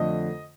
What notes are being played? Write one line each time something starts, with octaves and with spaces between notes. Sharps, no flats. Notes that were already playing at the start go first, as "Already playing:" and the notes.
Already playing: F2 D3 A3 D#5